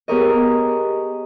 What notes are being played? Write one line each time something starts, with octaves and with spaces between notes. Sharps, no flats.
B3 G4 G#4 A#4 C#5 D#5